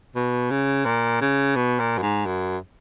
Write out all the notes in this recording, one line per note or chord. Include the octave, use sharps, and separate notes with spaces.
B2
C#3
A#2
C#3
B2
A#2
F#2
G#2
F#2